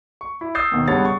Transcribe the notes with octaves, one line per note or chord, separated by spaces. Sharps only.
C#6
E4
D#6 E6 G6 A6 C7
D#2 B2 D#3
C#2 G2 G3 B3 C#5 A6
C#6